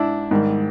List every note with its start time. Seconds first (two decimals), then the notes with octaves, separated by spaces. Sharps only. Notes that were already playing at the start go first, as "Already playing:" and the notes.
Already playing: G#2 D4 E4
0.31 G#2 D#3 G3